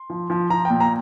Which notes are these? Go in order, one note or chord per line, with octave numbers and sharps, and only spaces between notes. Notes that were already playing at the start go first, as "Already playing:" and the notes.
Already playing: C6
F3
F3
F3 A#5
A#2 G5
A#5